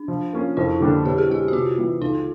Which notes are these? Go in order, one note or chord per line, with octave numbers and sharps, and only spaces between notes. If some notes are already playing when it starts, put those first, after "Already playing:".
Already playing: D4
F3
A#3 C#4 F4
F2 E4
D3 G3 A#3 D4
B2 G4
G#4
G#3 C4 G4
F#4
C3 F4
E3 G3 B3
C#2 D#4